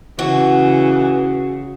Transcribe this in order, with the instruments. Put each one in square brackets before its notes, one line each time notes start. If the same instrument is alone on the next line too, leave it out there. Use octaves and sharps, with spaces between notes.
[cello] C#3 [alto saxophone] E3 [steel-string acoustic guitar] F#4